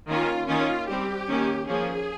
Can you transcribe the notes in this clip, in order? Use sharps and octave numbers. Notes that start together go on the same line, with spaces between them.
D#3 A#3 C#4 F4
D#3 A#3 C#4 F4
G3 C4 G4
D#3 A#3 C#4
F3 A#3 C#4 G#4